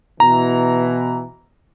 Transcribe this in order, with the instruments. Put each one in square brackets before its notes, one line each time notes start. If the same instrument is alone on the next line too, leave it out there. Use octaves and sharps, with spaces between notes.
[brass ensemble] B2 E3 [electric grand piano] A#5